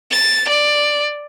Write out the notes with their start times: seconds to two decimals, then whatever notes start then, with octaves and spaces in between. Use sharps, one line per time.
0.11 A6
0.48 D5